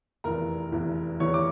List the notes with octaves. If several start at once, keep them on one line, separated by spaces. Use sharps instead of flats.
F1 E2 E3 A#4 A#5
F1 E2 E3
F1 E2 E3 C#5 C#6
D6